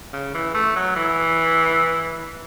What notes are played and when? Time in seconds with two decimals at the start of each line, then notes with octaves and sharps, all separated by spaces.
0.13 C#3
0.34 E3
0.55 A3
0.76 F#3
0.96 E3